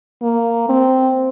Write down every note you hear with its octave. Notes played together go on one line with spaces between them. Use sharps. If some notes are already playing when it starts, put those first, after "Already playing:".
A#3
C4